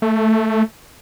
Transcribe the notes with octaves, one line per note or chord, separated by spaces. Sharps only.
A3